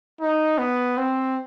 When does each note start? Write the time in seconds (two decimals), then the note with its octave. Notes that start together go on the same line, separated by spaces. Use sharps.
0.21 D#4
0.58 B3
0.97 C4